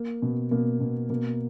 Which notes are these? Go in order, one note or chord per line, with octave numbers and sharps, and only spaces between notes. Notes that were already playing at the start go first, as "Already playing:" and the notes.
Already playing: A#3
B2
B2 A#3
B2
B2 A#3